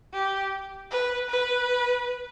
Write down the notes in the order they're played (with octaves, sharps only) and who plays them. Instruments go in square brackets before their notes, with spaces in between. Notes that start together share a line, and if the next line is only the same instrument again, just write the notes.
[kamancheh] G4
B4
B4